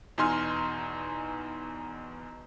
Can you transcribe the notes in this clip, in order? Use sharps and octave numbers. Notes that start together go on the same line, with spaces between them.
E2 B2 D#4 G#5 C6 F6